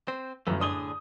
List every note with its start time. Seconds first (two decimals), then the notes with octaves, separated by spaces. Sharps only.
0.08 C4 C5
0.47 G1 F#2 E3 A3
0.60 A2 D3 D4 G#4 D#6 G7